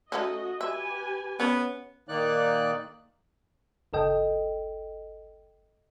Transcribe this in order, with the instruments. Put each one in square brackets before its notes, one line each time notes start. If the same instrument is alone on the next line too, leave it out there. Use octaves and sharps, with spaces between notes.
[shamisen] A3 C#4 D#4 [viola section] F#4 D#5
[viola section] G4 B4 G#5 [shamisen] E5
[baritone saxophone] B3 [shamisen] C#4 C#5
[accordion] A#2 D#3 A#3 D#4 D5 F#6
[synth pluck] G1 C#2 A4 D#5 G5